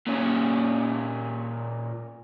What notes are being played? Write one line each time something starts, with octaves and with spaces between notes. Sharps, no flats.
A#2 C#4